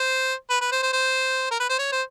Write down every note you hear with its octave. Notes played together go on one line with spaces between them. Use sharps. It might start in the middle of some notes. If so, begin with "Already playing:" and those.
Already playing: C5
B4
B4
C5
C5
C5
A#4
B4
C5
C#5
C5